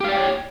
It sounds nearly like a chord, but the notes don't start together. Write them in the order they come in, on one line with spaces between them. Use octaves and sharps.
G4 F5 D5 G5 C#5